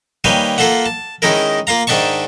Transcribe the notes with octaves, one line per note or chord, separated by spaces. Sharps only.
D#3 G3 A#3 B4 C#5 G#5
A#3 F4 A4 E5 F#5
A5
D#3 G#3 C#4 D#4 E4 A#4
A#3 F4 F5 A#5
G#2 D#3 D4 E5 A5 C#6